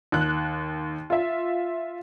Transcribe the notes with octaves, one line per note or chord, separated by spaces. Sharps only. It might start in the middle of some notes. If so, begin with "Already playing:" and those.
D#2 F#6
F4 E5